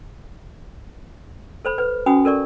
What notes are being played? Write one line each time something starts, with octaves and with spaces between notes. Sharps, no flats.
A4 C5 B5
B4
C#4 F#4 G#5 B5 D#6
A4 A#4 D5 C#6